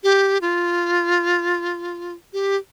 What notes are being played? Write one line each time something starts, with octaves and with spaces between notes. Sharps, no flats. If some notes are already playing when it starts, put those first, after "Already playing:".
G4
F4
G4